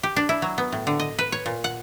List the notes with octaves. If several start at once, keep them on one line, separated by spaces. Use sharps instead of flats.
G4
D4
E4
F#3
B3
A2
D3
D#5
B4
C#5
A#2
F#5